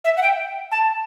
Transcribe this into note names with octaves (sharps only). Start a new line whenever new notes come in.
E5
F#5
G5
A5